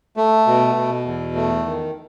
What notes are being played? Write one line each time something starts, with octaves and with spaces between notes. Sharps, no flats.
A3
B2
B2
E2
A3
D#3